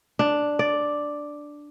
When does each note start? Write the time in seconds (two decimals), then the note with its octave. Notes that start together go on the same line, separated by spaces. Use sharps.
0.19 D4
0.59 D5